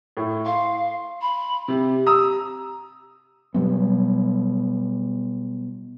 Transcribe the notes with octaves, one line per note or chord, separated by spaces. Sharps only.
A2
F5 C6
B5
C3 G4
A#5 D#6 E6
B2 F#3 G3 B3